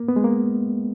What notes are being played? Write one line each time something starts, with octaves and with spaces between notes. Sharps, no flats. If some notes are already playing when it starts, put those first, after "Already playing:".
Already playing: A#3
B3
G#3
A#3